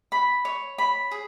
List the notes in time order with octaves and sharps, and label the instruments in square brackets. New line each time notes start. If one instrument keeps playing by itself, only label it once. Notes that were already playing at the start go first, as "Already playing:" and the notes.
[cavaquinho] B5
C#5
B5
G#4